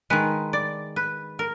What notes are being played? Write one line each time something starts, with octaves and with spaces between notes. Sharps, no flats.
D#3 G#3 B4
D5
B4
A#4